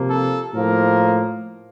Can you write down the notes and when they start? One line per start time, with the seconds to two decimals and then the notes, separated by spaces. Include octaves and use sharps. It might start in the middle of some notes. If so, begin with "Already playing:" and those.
Already playing: C3 F3 A#3
0.10 A4
0.54 A2 F3 A#3 A#4